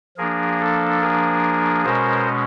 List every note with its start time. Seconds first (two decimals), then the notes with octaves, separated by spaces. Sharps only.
0.17 F3 A#3 D4 G#4 A#4
0.59 A4
1.01 G#4 A#4
1.85 B2 G#3 C#4 A#4 C5